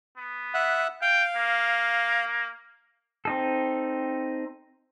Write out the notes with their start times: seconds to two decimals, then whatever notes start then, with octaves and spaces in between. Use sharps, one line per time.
0.18 B3
0.54 E5 F#5
1.02 F5 G5
1.37 A#3
3.25 C4 D#4 A4